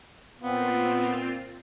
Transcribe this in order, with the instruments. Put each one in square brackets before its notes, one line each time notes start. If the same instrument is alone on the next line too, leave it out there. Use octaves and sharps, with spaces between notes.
[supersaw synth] A#2 C4 F4 [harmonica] B3